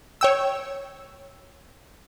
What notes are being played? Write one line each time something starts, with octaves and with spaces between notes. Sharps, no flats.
C#5 G5 E6